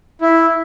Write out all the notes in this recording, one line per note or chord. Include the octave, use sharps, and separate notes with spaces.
E4